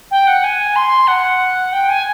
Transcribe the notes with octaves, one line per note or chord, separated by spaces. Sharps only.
G5
F#5
G#5
C6
F#5
G5
G#5